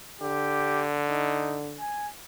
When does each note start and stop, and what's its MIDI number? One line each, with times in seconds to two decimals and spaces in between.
0.21 1.81 50
0.21 0.85 67
1.09 1.58 63
1.79 2.08 80